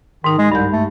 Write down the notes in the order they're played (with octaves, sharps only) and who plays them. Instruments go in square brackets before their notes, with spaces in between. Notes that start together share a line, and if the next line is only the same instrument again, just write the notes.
[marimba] G#2 D#4 [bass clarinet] D#3
[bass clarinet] G#3
[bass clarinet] C2 [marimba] G2 G#3 G6
[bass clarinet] A3